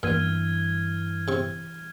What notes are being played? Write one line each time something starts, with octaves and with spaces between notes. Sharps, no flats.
G2 A#2 E3 B3 F6 G#6 D#7
C3 C#6